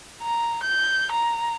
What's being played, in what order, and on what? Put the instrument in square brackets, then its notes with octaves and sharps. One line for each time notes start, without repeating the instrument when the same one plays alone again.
[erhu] A#5
G6
A#5